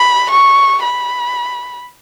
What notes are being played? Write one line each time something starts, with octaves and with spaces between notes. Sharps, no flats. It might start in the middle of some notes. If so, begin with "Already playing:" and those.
Already playing: B5
C#6
B5